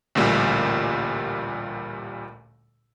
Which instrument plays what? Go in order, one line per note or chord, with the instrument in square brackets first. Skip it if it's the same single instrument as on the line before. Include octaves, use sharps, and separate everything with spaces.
[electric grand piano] A1 D2 A#2 G3